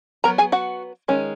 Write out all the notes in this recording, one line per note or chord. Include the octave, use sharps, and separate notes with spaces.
F#3 B3 D#4 A#4 A#5
G#4 G#5
F#4 F#5
D#3 G#3 C#4